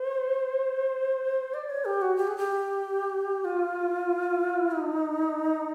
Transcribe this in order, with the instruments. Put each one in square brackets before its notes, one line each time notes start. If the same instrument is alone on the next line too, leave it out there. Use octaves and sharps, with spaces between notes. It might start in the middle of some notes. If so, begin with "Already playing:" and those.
Already playing: [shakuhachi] C5
D5
C#5
G4
F#4
G4
G#4
G4
F4
D#4